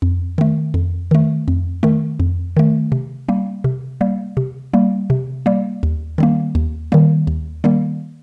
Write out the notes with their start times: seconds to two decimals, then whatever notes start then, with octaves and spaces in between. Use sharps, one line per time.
0.02 F2
0.38 D#3 A3
0.74 F2
1.11 D#3 A3
1.48 F2
1.83 D#3 A3
2.20 F2
2.57 D#3 A3
2.92 C3
3.29 G3 A#3
3.64 C3
4.01 G3 A#3
4.37 C3
4.74 G3 A#3
5.10 C3
5.46 G3 A#3
5.83 D#2
6.18 D#3 G3 A#3
6.55 D#2
6.92 D#3 G3 A#3
7.27 D#2
7.64 D#3 G3 A#3